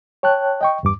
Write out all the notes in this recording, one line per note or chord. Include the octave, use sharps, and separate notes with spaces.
C#5 G5 A5 F#6
D#5 G5 C#6
E2 G2 D6